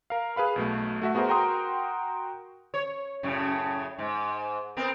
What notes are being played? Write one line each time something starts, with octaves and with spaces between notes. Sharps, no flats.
A#4 F5
G#4 B4 F5 B5
B1 B2 A3
A3 F#4 E5
B3 F#4 G#4 A#4 C5
F#4 A#4 G5 A#5 C6 D#6
C#5
F#2 A2 C#3
G#2
B3 C4 A#4